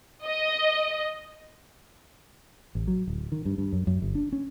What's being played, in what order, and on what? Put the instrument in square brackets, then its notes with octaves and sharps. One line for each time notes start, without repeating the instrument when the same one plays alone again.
[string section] D#5
[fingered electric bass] A1
F#3
D1
D#3
G2
G2
F#2
F#2
G1
D4
C#4